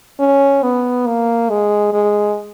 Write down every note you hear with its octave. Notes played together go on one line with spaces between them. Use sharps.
C#4
B3
A#3
G#3
G#3